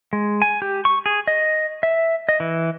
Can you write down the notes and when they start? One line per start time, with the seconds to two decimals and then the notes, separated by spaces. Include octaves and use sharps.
0.13 G#3
0.42 G#5
0.62 G4
0.85 C#6
1.06 G#4
1.27 D#5
1.83 E5
2.29 D#5
2.40 E3